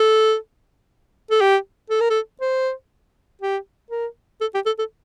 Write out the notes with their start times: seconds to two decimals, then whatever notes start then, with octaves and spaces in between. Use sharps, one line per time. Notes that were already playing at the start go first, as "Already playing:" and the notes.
Already playing: A4
1.31 A4
1.41 G4
1.90 A4
2.00 A#4
2.10 A4
2.41 C5
3.42 G4
3.91 A#4
4.41 A4
4.54 G4
4.66 A4
4.79 A4